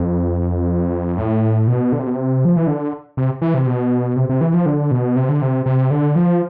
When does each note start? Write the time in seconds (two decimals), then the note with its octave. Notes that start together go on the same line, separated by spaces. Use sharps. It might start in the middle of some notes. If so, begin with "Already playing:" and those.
Already playing: F2
1.18 A2
1.67 B2
1.92 D3
2.00 C3
2.07 B2
2.14 C3
2.45 F3
2.57 E3
2.67 D3
3.17 C3
3.42 E3
3.54 C3
3.67 B2
4.16 C3
4.29 C3
4.41 E3
4.54 F3
4.66 D3
4.91 B2
5.16 C3
5.29 D3
5.42 C3
5.66 C3
5.91 D3
6.16 F3